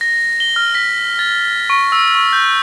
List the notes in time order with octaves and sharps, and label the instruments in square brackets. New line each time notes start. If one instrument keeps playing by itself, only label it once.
[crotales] A#6
G7
F6
B6
A6
C#6
E6
C#6
G6